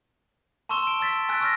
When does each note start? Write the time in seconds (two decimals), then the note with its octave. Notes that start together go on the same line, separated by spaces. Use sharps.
0.69 A5 C6 C#6 E6 E7 G7
0.87 D7 G7
1.00 A5 E6 A6 B6
1.29 G#5 E6 F#6 A6 B6 D7
1.41 C#6 E6 F6 A#6